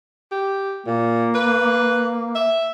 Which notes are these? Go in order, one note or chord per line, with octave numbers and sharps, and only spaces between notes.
G4
A#2 A#3
B4
E5